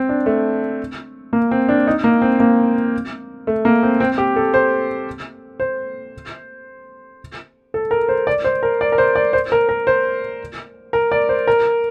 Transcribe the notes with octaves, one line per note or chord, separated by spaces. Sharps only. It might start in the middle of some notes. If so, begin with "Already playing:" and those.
Already playing: C4
D4
A3
A#3
C4
D4
D#4
A#3
C4
A#3
A3
A#3
C4
C4
G4
A4
C5
C5
A4
A#4
C5
D5
C5
A#4
D5
A#4
C5
D5
C5
A#4
A#4
C5
A#4
D5
C5
A#4